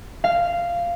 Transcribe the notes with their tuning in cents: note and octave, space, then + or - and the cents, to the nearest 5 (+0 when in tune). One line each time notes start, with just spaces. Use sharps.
F5 -10